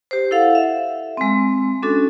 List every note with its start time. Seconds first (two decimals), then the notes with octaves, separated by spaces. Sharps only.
0.11 G4 C5
0.31 E4 A4 F5 F#5
0.55 E5
1.17 G#3 C4
1.83 C#4 D4 F#4 A4